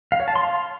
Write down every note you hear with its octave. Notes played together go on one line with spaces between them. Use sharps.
F5
C#5
A5
C6
F5